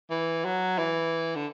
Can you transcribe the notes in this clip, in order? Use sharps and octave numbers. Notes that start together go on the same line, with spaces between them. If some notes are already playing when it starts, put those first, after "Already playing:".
E3
F#3
E3
D3